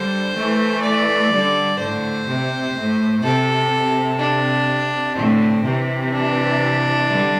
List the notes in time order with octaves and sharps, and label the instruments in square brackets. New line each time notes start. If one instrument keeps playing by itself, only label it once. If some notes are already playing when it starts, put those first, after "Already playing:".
Already playing: [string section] D3 G3 [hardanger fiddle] C5
[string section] E3 A3
[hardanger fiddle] D5
[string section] D3 G3
[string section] A2 D3 [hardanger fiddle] C5
[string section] C3
A2
[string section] C3 [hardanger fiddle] A4
[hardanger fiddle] D4
[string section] A2 D3 [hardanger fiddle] C4
[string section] C3 E3
[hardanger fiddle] D4
[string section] D3 G3